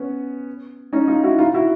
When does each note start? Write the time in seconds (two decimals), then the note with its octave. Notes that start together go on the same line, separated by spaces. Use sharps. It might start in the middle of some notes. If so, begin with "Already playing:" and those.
Already playing: B3 C#4
0.93 C#4 D#4
1.08 D#4 F4
1.23 E4 F#4
1.39 D#4 F4
1.54 E4 F#4